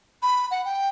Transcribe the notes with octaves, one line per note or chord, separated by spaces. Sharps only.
B5
F#5
G5